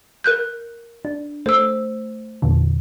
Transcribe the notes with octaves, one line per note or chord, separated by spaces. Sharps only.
A#4 F#6 G6
D4
A3 C5 E6
E2 A#2 D3